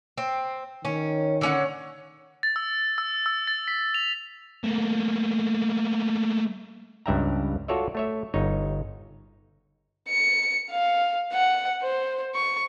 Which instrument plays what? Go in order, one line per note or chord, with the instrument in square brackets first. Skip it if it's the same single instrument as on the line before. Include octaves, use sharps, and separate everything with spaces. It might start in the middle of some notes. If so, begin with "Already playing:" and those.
[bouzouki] C4
[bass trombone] D#3 [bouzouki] C#4
[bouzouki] D3 C#4 F#5
[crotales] A6
E6
E6
E6
A6
B6
F7
[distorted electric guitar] A3 A#3
[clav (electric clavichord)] C#2 G2 D5 E5 G5 A#5
F4 F#4 A4 C#5 D5 E5
A3 C#5 E5
G1 D#4 C#5
[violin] C#7
F5
F#5
C5
C#6